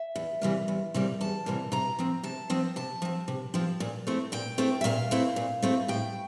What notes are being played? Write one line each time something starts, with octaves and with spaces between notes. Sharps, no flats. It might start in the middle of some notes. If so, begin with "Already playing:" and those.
Already playing: E5
E2
C3 E3 G3 A#3
E2
C3 E3 G3 A#3
E2 A5
C3 E3 G3 A#3
C3 A#5
F3 C4
C3 A5
F3 C4
C3 A5
F3 C4
C3
F3 C4
A#2
A3 C4 E4
A#2 G5
A3 C4 E4
E5
A#2 F5
A3 C4 E4
A#2
A3 C4 E4
A2 G5